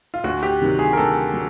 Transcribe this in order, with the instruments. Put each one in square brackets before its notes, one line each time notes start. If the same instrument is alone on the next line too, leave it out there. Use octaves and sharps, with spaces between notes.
[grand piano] F4
[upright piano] D2 [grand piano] F#4
[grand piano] G4
[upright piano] C3 D#3 F#3
[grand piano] G#4
A#4
[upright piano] D2 [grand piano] A4
[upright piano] F#3